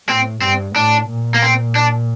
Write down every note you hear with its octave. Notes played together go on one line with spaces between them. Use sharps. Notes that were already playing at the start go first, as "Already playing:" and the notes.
A2 C4
G2 C4
A2 D4
A#2
A#3
C4
D4